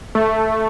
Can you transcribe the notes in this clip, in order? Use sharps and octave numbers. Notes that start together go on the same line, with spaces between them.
A3